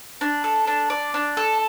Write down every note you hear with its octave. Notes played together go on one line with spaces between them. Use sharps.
D4
A4
D4
D5
D4
A4